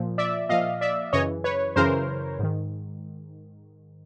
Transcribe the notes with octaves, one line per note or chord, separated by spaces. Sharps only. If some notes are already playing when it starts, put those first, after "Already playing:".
Already playing: A#2 F3
D5 E5
A#2 F3 D#5 F5
D5 E5
F#2 C#3 E3 C#5 D#5
B4 C#5
F#2 C#3 E3 A#4 C5
G#2 D#3